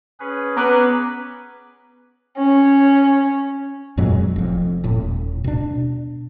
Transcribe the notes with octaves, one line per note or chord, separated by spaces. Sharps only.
C#4 G#4 B4
B3 A#5 D6 F#6
C#4
F2 A#2 F#3 G#3
F1 F2
D#1 A2
B2 D4